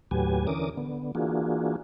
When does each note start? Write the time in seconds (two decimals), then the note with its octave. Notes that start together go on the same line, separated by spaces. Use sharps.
0.11 D#2 A2 F#3 G4 B4 G#5
0.47 D3 E3 C#4 A#4 D6 D#6
0.77 D3 B3
1.15 E3 A#3 D4 F4 F#4 G#4